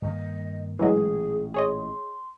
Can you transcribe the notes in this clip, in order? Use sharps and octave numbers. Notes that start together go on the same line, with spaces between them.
G2 D#3 A#3 D#5
A1 A#2 E3 F#3 G#3 G#4
G#4 C#5 D#5 C6